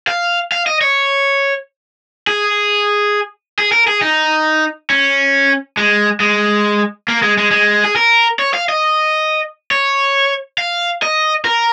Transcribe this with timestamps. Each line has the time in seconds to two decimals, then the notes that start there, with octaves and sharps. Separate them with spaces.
0.08 F5
0.52 F5
0.67 D#5
0.81 C#5
2.27 G#4
3.59 G#4
3.72 A#4
3.88 G#4
4.02 D#4
4.90 C#4
5.77 G#3
6.20 G#3
7.08 A#3
7.22 G#3
7.38 G#3
7.51 G#3
7.85 G#4
7.96 A#4
8.39 C#5
8.54 F5
8.69 D#5
9.71 C#5
10.58 F5
11.02 D#5
11.45 A#4